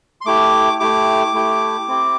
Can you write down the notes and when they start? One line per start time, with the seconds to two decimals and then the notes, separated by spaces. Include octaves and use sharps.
0.21 C6
0.26 A3 E4 G4 D6
0.80 A3 E4 G4 D6
1.34 A3 E4 G4
1.88 C4 E4 G4